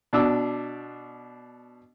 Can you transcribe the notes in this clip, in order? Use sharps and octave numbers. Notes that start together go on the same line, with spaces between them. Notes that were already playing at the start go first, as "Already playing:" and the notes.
B2 D4 D6 E6